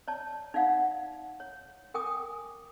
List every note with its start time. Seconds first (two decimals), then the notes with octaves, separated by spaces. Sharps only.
0.08 C#5 D5 A5
0.54 D#4 D5 F5 F#5
1.40 C#5
1.94 A#4 G5 G#5 D6 D#6